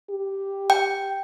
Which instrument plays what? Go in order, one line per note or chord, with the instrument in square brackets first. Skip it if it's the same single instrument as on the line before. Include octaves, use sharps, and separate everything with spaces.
[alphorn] G4
[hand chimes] G5